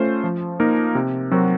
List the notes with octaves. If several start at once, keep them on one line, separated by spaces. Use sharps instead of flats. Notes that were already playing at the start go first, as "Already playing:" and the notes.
Already playing: A3 C#4 F4 C5
F3
A#3 D#4 A#4
C3
F#3 C4 F#4 A#4